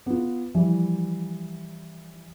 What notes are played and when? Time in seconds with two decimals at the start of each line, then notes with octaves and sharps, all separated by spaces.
0.06 B3 F4
0.55 E3 F3 G3